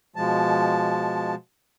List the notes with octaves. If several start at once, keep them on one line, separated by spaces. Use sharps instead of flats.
B2 F3 G#3 A5